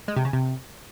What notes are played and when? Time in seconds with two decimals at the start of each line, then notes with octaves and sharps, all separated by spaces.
0.08 G#3
0.16 C3
0.25 C#3
0.33 C3